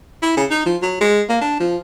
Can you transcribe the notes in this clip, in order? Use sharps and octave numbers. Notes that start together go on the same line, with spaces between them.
E4
C#3
D#4
F3
F#3
G#3
A#3
D4
F3